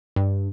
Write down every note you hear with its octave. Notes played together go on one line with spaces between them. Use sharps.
G2